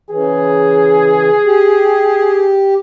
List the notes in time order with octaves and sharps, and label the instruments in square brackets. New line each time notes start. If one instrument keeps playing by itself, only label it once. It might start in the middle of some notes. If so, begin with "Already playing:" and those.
[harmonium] C#3 E3 [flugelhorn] G#4
[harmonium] G4